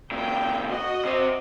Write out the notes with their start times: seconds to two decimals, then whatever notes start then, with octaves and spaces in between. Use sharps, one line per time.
0.11 A#2 C#3 G5
0.68 F#4 D#5
1.05 C3 C5